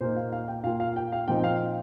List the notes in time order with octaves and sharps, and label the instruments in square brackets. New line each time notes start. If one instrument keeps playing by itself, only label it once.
[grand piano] A#2 A#3 D#4 C5
F5
F5
G5
A#2 A#3 F4 F5
F5
G5
F5
A#2 F3 C4 D#4 G5
F5